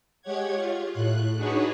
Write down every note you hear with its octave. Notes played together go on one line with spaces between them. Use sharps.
G#3 G4 C#5 F#5 G#6
F4
A2 F#6
D4 D#4 F#4 G#4 B4 C#5